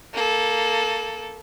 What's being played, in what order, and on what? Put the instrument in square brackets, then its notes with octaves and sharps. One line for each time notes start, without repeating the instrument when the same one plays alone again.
[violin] A#3 A4